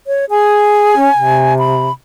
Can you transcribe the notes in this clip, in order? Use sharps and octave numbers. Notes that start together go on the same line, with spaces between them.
C#5
G#4 G#5
C#4
C3
B5